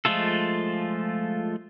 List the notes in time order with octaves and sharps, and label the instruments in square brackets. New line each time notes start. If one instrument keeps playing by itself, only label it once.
[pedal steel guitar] F3 G#3 A3 F4 A4